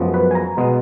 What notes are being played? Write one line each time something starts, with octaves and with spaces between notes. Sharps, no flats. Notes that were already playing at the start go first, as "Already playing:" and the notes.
Already playing: F#2 F3 G#3 B3
B4
G#5
A#5
B2 G#3 B3